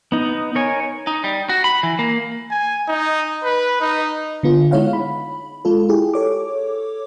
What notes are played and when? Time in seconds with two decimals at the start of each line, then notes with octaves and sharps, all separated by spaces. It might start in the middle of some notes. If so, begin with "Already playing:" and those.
0.12 B3 D#4
0.55 A#4 C#5 G#5
1.07 D#4
1.24 G3
1.49 F#4
1.64 B5
1.83 E3
1.99 A#3
2.50 G#5
2.88 D#4
3.44 B4
3.81 D#4
4.43 D3 B3 F4
4.71 G#3 D#4 E4 C#5 F5 F#5
4.93 B5
5.65 G#3 F4 A4
5.89 E4 G4 G#4
6.14 A4 C#5 D6